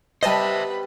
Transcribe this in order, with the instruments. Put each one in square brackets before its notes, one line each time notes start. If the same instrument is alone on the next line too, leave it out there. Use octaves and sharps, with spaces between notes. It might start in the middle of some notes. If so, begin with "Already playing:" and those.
[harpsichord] G3 B3 [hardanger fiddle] B4 B5 [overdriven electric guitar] C5 E5 [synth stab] D#5 A5